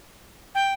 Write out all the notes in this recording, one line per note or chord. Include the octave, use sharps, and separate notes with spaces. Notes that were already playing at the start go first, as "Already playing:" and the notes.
G5